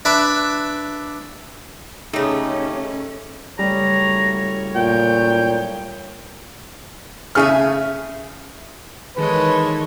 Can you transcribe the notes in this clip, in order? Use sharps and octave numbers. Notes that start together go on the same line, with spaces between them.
D4 B4 E5 B5 D6
C#3 A3 C#4 D#4 G4
F#1 G3 A3 C#5 A#5
A#2 G5
C#3 A3 G#4 E5 G#5 F6
D#3 E3 G#3 A4 B4 C#5 D#5